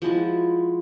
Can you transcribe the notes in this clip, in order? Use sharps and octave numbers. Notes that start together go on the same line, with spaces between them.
F3 G#3 E4 F#4